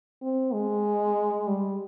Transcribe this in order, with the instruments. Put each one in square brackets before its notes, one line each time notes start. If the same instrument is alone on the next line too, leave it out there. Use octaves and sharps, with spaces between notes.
[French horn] C4
G#3
G3